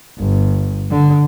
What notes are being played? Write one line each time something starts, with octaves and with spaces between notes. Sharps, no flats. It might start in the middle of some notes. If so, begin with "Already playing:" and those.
G1
D3